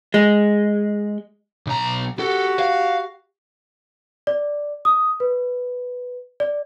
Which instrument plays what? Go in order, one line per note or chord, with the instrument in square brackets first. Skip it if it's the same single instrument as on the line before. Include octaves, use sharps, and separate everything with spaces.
[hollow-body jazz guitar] G#3
[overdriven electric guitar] B1 A#5
[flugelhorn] F#4 [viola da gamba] G4 [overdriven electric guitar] A4
[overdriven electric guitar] F5
[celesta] D5
D#6
B4
D5